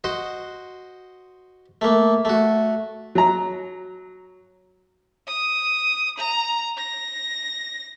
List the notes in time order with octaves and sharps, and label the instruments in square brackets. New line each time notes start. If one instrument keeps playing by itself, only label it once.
[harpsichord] F#4 C5 D#5
A3 A#3
A3 F#4
[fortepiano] F#3 A#5
[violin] D#6
A#5
A#6